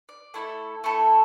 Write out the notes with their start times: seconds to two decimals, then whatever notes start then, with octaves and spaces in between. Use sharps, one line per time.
0.09 D5
0.34 A3 E4 A4
0.84 A3 E4 A4